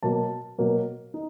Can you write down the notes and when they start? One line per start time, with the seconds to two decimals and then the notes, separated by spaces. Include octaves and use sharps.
0.03 B2 F#3 A#3 A5
0.58 B2 F#3 A#3
1.14 D#4